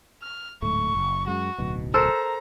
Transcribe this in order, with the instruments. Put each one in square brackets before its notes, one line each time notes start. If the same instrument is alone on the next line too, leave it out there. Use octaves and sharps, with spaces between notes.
[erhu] F6
[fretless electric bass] D1 G#2 A3 [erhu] C#6
[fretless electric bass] F#1
[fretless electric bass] F#2 G#3 [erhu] F#4
[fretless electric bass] D1 B1 B2
[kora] A4 A#4 C5 [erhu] A#5